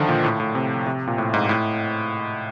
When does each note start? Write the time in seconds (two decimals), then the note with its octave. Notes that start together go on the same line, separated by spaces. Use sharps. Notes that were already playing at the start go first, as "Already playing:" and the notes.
Already playing: D3 D#3 F3
0.09 A#2
0.24 A2
0.40 A2
0.55 C3
0.86 C3
1.07 A#2
1.18 A2
1.34 G#2
1.49 A2